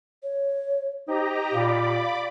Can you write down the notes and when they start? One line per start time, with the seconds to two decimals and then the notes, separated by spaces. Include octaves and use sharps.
0.23 C#5
1.08 D#4 G4 C5 D#5 A#5
1.54 A#2 D5 F5 B5 D6